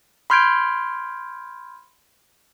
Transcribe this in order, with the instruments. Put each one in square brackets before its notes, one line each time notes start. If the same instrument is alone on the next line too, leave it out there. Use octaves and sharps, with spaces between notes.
[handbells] B5 C6 F6 G6 G#6 D7